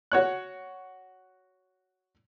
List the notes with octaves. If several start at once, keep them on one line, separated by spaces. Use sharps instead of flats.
F#4 C#5 F#6